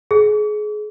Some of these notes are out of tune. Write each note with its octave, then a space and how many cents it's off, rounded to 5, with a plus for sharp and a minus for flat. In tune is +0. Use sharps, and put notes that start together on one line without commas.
G#4 +25